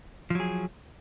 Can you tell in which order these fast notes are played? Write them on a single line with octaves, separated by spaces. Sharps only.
F3 F#3 G#4